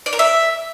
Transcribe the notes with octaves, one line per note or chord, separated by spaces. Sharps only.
D5
A#4
E5